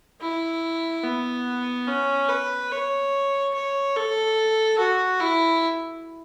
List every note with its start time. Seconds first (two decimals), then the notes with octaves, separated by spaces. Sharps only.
0.21 E4
1.04 B3
1.88 C#4
2.29 B4
2.71 C#5
3.54 C#5
3.96 A4
4.79 F#4
5.20 E4